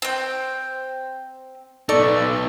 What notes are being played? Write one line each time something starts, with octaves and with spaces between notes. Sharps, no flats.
C4 G5
B3 D#4 A4 D5 C#6